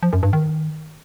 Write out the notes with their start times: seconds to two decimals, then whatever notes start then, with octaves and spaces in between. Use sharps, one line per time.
0.03 F3
0.13 F#2
0.23 G2
0.33 D#3